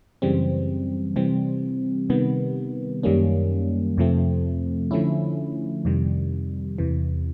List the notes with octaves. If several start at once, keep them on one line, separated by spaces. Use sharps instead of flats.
F#2 C#3 E3 G3 C4
C3 E3 G3 C4
C3 D#3 G3 B3
F#2 D#3 G3 A#3 C#4
F2 C3 F3 A3 C4
D3 F3 A3 C#4 E4
F2 C3 D#3 G3
E2 C3 E3